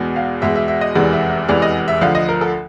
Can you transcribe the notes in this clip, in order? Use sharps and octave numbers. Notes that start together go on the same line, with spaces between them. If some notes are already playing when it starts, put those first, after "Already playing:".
Already playing: E2 B2 G#3
F5
E2 B2 G#3 E5
E5
E5
D#5
F1 E2 C3 E3 G#3 D5
E5
E5
F1 E2 C3 E3 G#3 D5
D#5
E5
D2 D3 F3 F5
D#5
A#4
A4